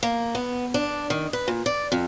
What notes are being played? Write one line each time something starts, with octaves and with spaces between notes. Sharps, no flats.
A#3
B3
D4
D#3
B4
A#2
D5
F2